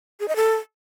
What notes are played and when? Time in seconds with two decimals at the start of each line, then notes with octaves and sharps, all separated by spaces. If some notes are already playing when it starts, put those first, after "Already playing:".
0.20 G#4
0.28 D#5
0.36 A4